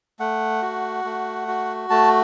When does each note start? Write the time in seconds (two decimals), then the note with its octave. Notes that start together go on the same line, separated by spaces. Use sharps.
0.19 A3 F#5
0.62 F#4
1.05 A3
1.48 F#4
1.90 A3 A5